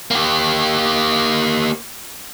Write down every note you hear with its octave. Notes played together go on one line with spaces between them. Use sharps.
A#3 G4